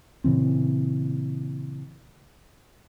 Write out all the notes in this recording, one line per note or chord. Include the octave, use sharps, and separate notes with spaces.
A#2 C#3 E3 C4